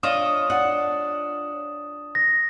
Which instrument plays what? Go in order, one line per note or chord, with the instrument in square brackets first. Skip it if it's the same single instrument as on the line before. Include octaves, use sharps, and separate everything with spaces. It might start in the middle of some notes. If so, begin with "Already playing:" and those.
[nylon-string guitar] D4 [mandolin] F4 C#5 D#5 [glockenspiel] D#6 E7
[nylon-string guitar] D4 F#5
[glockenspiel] A#6